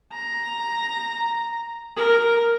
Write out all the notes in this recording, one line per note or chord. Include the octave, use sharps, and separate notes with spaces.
A#5
A#4